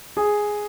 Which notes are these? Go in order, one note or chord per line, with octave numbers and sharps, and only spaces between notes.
G#4